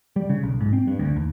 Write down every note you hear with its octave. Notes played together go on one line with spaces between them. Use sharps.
G3
C#3
B1
G#2
C4
G2
D2
D#2